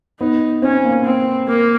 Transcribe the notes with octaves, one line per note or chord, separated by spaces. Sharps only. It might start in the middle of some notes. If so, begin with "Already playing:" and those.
B3 D#4
C4 C#4
A#3
C4
A#3